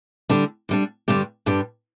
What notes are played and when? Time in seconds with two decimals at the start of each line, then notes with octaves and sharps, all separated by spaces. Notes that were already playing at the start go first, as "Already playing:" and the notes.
0.29 D3 G3 D4
0.69 D3 G3 D4
1.08 G2 D3 G3 D4 G4
1.46 G2 D3 G3 D4 G4